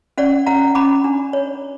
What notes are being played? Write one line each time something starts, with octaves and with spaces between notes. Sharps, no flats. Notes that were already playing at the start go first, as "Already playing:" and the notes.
C#4 D5 F#5
C#4 F#5 A#5
C#4 B5 D6
D4
C#5